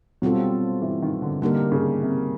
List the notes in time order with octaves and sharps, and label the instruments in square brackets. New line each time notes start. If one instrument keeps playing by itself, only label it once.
[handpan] B2 G3 C4 F4 A4 [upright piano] F#3
[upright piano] E3
D#3
D3
[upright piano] D3 [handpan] G3 A#3 D#4 G4 A#4
[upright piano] C#3
C3